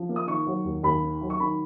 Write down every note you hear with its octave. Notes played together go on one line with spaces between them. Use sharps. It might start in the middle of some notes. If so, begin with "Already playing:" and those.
Already playing: F3
A#3
D#6
D#3 C#6
F#3
D#2
D#2 B5
D#3
F#3
C#6
D#3 B5